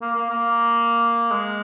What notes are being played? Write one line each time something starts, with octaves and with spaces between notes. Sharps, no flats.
A#3
A#3
A#3
G#3